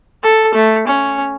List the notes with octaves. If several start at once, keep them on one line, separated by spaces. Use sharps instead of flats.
A4
A3
C#4